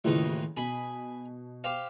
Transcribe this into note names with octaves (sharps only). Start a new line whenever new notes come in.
A1 D#2 C#3 E3 F3 D#4
B2 G#4 B5
G4 C5 F5